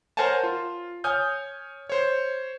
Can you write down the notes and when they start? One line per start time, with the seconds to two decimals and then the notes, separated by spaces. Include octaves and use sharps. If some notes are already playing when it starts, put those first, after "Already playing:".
0.17 A#4 C5 C#5 F#5 G#5 A5
0.43 F4
1.04 C#5 G#5 D#6 F6 G6
1.89 C5 C#5